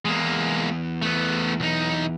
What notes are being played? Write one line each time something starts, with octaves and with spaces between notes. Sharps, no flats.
E2 G#3 A#3
A3 B3
B1 D#4